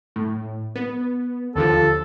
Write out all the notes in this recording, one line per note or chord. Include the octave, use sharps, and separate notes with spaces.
A2
B3
D#2 D3 F3 A4